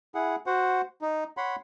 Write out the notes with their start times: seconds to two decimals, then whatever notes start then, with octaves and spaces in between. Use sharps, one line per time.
0.15 E4 G#4 F#5
0.46 F#4 C5 F#5
1.01 D#4
1.37 C#5 F#5 B5 C6